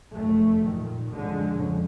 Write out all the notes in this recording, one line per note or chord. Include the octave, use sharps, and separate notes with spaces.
F1 F#2 A3
A#2 D#3
F2 D3 G#3
F2 C#3